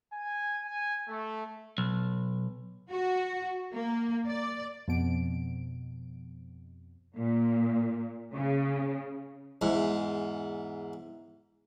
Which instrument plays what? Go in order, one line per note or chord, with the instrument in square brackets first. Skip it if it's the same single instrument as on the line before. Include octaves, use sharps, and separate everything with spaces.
[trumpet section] G#5
G#5
A3
[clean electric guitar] B1
[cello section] F#4
A#3
D5
[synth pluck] F2 B2 D7
[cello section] A#2
C#3
[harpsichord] E2 G#2